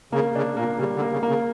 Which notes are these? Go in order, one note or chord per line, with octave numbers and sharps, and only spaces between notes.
C#3 A#3
C#3 D4
A#2 A#3
C#3 G3
D3
A#3
C#3
A#3
C#3